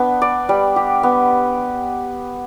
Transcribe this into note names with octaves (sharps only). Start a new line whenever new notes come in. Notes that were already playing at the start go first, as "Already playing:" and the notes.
Already playing: B3 D4
D5
G3
G4
B3